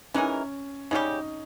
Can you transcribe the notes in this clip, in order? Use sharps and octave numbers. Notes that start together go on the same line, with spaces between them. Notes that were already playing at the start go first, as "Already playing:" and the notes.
E3 G#3 C#4 D#4 A#4
C#3 G3 C#4 D#4 G4